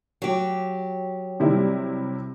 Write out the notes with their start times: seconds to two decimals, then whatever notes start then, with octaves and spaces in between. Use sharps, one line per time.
0.22 F#3 G4
1.40 C3 G3 E4